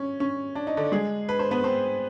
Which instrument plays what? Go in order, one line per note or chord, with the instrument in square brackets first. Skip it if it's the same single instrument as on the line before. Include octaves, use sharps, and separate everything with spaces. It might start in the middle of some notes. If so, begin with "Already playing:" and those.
Already playing: [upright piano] C#4
C#4
D4
D#4
D3 D4
G#3 G#4
B4
C5
B3 B4
C4 C5